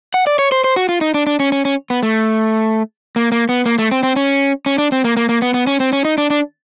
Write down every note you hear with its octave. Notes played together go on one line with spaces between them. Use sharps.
F#5
D5
C#5
C5
C5
F#4
F4
D#4
D4
D4
C#4
C#4
C#4
B3
A3
A#3
A#3
B3
A#3
A3
C4
C4
C#4
C#4
D4
C4
A#3
A#3
A#3
B3
B3
C#4
C4
C#4
D#4
D4
D4